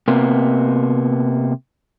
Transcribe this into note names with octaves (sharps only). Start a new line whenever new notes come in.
C3 A#3 B3